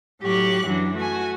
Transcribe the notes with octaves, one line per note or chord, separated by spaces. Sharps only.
A2 F#3 G4 C#6 F#6
F#2 E3 F#3 D4
A3 F#4 G#5